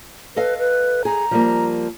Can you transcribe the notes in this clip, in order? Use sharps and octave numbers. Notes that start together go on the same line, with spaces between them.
A4 B4 D#5 F5
B4
G#4 A#5
F3 G3 A#3